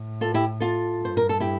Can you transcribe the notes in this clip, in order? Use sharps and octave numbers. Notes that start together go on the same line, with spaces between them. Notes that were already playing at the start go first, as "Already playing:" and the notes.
Already playing: A2
F4 A4
E4 G4
F4 A4
G2 C5
A#4
A4
E4 G4